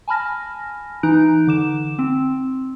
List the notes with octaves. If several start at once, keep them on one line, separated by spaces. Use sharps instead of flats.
G#5 A5 B5 F6 A#6
E3 D#4 A#5 F#6 D7
D3 D6 E7
C4